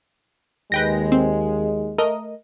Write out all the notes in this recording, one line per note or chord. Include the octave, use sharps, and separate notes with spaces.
D#2 G#3 B4 G5 A#6
C4
A3 A#4 D#5